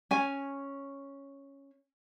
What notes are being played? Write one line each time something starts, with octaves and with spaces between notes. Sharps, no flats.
C#4 G#5